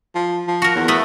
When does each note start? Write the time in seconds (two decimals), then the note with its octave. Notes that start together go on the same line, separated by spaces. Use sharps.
0.15 F3
0.48 F3
0.62 F#4 A#4
0.75 E2
0.88 A3 B3 B4